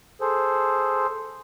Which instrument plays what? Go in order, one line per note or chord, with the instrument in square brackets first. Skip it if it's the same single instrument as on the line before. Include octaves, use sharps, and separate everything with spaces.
[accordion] G#4 A4 C5